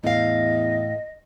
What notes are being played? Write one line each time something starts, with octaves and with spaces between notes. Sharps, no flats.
E2 A2 D#5 F5